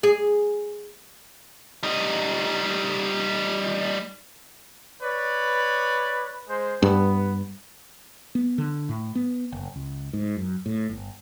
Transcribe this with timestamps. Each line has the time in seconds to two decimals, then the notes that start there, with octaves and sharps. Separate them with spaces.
0.03 G#4
1.83 G3 D#4
5.03 B4 C#5 D5
6.49 G#3 C5
6.82 G2 B3
8.35 B3
8.58 D3
8.89 A2
9.15 B3
9.52 F#1
9.76 C#2
10.13 G#2
10.37 F#2
10.66 A2
10.89 G1